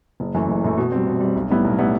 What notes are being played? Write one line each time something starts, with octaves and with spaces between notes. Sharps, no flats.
F#1
F#2 E3 A3
F#1
F#2 E3 A3
B2
G3 C4
B2
G3 C4
B1
A2 G3 B3 E4
B1
A2 G3 B3 E4